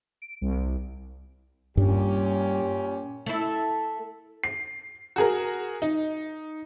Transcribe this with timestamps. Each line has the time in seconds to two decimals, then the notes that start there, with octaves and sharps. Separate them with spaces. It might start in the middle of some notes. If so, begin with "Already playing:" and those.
0.22 D7
0.41 C2
1.77 G2 A#2 G3 C#4 G4
3.26 A3 E4
4.44 C7
5.16 F#4 G#4 A#4
5.82 D#4